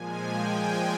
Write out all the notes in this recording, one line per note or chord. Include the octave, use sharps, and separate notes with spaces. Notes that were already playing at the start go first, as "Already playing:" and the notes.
Already playing: A#2 F3 G#3 G#5
G5